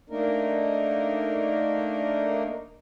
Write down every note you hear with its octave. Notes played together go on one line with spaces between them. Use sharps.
A3 A#3 D4 D#4 A#4